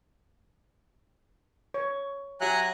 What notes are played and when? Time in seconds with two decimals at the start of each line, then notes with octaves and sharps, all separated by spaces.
1.74 C#5
2.41 F#3 F#4 G4 E5 G#5 A#5 F#6